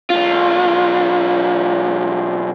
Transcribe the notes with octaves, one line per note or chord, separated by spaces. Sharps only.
B1 F4